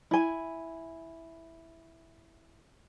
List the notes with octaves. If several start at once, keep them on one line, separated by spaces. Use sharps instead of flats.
E4 G#5